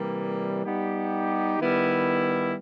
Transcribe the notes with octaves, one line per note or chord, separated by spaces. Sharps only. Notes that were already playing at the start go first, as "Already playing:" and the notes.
Already playing: C3 E3 G3 A#3
G3 B3 D#4 G4
D#3 G3 B3 E4